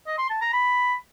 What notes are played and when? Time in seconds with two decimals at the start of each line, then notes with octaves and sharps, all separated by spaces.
0.07 D#5
0.18 C6
0.30 A5
0.41 A#5
0.53 B5